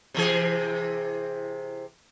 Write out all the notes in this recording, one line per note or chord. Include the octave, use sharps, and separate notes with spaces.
C3 E3 G#4